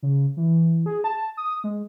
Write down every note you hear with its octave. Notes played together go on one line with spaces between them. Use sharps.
C#3
E3
G#4
A5
D#6
G#3